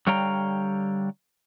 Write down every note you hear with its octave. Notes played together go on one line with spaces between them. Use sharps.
D3 G3 C#5 F5 G5 A#5